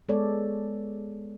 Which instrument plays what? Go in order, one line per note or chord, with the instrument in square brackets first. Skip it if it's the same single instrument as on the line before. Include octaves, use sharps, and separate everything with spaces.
[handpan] G#3 B3 A4 C#5 D5